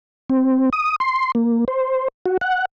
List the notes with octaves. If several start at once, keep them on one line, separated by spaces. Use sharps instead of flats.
C4
D#6
C6
A#3
C5
F#4
F#5